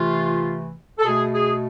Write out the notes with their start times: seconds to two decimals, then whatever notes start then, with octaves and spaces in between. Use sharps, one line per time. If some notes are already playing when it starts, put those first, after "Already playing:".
Already playing: C3 E3 A3 F4
0.99 A4
1.05 B2 A3 G#4
1.33 G#4